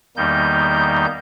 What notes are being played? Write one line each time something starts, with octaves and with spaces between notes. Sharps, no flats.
E2 D#3 G3 A#3 D#4 G6